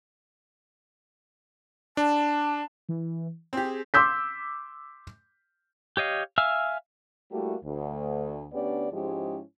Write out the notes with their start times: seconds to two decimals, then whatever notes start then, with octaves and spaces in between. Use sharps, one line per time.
1.97 D4 A5
2.89 E3
3.53 C4 G4 G#4
3.94 C6 D6 E6 G6 B6
5.97 G4 C#5 D#5 F5
6.38 E5 F5 G#5 E6 F6
7.31 G3 A3 A#3 E4 F#4 G4
7.65 D2
8.53 D2 B3 C#4 D4 G4 D5
8.92 G#2 F3 G#3 C#4 E4 G4